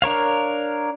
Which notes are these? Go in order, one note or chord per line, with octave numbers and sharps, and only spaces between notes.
D4 A#4 C#5 F5